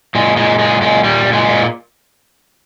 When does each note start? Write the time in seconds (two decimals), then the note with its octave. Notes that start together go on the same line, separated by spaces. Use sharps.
0.15 A#2 G#3
0.36 A#2 G#3
0.59 A#2 G#3
0.82 A#2 G#3
1.04 A#2 G3
1.25 A#2
1.33 G#3
1.49 A#2